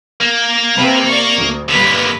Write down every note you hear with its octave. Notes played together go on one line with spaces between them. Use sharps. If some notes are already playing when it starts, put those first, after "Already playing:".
A#3
C3 B4 A5
D5 C#6
D2
G2 D3 A#3 B4 B6